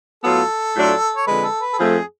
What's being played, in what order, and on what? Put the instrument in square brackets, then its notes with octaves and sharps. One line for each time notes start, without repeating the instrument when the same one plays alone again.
[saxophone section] A2 F#3 B3 F4 [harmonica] A4
[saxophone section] A2 F#3 A3 D4 F4
[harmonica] C#5
[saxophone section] F2 D3 G#3 [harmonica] B4
[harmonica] A4
B4
A4
[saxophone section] F2 F3 A3 [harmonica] G#4